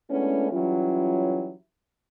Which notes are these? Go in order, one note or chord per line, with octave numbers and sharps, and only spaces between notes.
G#3 A3 B3 C#4 D4 E4
E3 F#3 G3 C#4 E4 F4